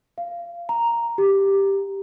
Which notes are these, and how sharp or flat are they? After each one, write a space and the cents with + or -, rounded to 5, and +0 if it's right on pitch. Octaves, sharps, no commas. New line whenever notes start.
F5 -20
A#5 +0
G4 +0